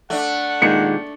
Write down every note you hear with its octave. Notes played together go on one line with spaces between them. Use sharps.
A3 D4 F#5
A#2 D#3 G#3 C#7